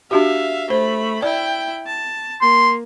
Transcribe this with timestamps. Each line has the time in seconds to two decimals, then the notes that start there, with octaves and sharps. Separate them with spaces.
0.11 D4 F#4 G4 E5 F5
0.70 A3 C5 B5
1.22 E4 D5 G5
1.87 A5
2.42 A#3 C6